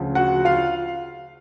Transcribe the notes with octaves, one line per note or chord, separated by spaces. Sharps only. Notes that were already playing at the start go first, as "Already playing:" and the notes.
Already playing: D2 C#3 F3
F#4 F#5
F4 F5